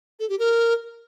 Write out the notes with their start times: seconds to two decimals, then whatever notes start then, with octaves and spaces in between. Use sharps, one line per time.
0.20 A4
0.29 G4
0.39 A#4